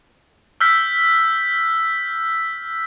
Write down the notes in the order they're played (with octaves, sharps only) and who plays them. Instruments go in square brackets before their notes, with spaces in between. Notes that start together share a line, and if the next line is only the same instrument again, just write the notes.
[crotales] E6 F6 G6 B6